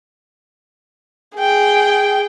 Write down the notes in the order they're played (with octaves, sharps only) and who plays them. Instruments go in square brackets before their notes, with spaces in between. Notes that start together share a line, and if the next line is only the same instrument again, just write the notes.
[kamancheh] G#4 G5